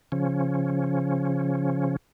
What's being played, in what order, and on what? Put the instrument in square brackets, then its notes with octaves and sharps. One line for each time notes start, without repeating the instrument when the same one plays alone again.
[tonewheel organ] C#3 F3 C#4